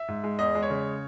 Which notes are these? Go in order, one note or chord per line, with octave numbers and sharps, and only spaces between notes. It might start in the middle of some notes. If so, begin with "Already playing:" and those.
Already playing: E5
G#2
G#3
E2 D#5
G#3
C#5
C#3